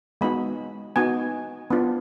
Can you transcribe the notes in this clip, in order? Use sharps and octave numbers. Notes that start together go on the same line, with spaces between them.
G#3 B3 D#4 F#4 B5
B3 D#4 F#4 G#5
B3 D4 F4